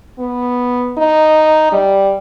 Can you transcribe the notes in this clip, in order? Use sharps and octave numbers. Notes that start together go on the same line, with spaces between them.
B3
D#4
G3